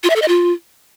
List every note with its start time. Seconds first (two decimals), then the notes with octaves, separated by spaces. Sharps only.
0.04 F4
0.10 E5
0.16 A4
0.22 D#5
0.28 F4